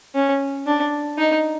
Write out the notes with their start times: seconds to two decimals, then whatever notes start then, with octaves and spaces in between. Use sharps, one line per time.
0.15 C#4
0.67 D4
1.18 D#4